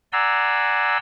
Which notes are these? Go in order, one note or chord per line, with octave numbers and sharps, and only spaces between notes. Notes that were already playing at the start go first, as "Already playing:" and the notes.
D5 F#5 G#5 A#5 C6 E6